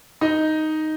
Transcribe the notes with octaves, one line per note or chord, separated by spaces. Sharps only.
D#4 D#5